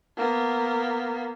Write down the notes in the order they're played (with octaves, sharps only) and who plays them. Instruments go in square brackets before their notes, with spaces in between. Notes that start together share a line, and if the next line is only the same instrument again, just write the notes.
[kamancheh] A#3 B3